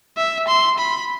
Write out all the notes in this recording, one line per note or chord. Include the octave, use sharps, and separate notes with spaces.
E5
C6
B5